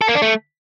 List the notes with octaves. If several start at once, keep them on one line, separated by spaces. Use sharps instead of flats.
A4
A#3
D4
A3